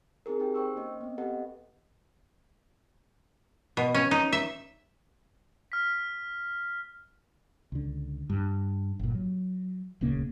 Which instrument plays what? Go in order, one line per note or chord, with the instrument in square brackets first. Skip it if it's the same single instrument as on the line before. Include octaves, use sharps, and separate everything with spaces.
[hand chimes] C4 D#4 G#4 A#4
D#4 G4 G5
C5 G5 C#6 E6
A#3 C#4 D#5
B3 C4
G4 A4 B4 D#5 F#5
[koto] B2
C#4
D#4
E5
[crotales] F6 B6
[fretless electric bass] C#2 D3
G2
G1 A#2
F#3
D#1 C#2 C#3 A#3